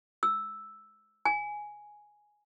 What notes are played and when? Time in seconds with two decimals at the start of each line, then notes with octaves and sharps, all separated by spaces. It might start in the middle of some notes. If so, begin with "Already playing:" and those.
0.23 E6
1.25 G#5